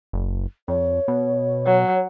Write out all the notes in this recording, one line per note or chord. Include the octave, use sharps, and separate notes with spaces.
F#1
F2 C#5
B2
F#3